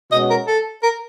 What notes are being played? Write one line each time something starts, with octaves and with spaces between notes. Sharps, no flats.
B2 G#3 C#4 F#4 D#5
A#4
A4
A#4